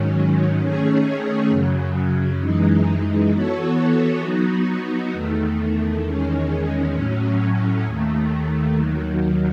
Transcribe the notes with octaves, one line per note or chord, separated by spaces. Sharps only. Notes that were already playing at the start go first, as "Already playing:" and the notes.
Already playing: G#2 D#3 F#3 C#4
D#3 A3 C#4 G#4 C#5
F#2 C#3 F#3
F#2 E3 G#3 D#4
E3 B3 F#4 A4 C#5
F#3 B3 D#4 F#4
E2 D#3 A3
E2 D#3 G#3 C#4
A2 F#3 C#4
D#2 D#3 A3
D#2 D#3 F#3